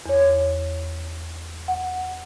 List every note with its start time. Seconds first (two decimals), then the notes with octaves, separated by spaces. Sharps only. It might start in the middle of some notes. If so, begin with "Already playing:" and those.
0.06 E2 C#5
1.68 F#5